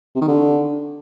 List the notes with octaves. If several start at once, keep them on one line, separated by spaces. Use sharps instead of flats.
C3
D#3
D3